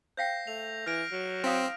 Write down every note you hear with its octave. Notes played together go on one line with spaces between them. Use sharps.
C5 F5 G5 G6 A#6 C7
A3 F7
E3 F6 A#6 D7
F#3
C4 E4 F5 D#6